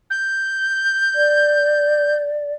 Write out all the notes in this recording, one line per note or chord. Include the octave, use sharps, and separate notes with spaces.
G6
D5